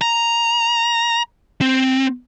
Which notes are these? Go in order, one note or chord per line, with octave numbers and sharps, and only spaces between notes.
A#5
C4